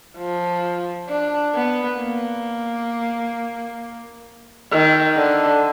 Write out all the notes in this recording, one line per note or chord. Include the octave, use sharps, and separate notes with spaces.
F3
D4
B3
A#3
D#3
D3